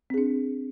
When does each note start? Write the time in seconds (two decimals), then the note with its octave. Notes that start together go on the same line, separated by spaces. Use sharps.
0.10 C4
0.14 G#4
0.18 D4